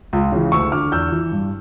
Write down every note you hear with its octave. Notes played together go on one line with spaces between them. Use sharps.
C#2
C#3 E3
D2 C#6 E6
D3 D6 F6
E2 E6 G6
E3
G2